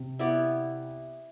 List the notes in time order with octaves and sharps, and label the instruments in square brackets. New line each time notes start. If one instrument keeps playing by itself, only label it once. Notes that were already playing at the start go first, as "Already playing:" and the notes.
Already playing: [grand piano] C3
[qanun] B3 E4 G4 D5